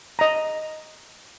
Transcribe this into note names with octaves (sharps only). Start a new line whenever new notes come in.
D#5 A#5